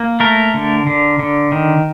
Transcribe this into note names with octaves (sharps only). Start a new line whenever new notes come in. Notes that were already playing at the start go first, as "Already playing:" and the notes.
Already playing: A#3
A3 A#4
D3
D3
D3
D#3